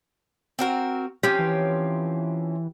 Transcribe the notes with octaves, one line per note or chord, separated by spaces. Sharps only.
C4 F#4 A#4
F3 C4 C#4 G4
E3